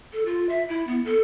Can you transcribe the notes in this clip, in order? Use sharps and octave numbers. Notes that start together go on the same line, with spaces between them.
A4
F4
E5
E4
B3
A4